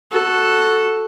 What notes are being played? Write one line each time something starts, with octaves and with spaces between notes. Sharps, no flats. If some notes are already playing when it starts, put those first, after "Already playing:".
F#4 A4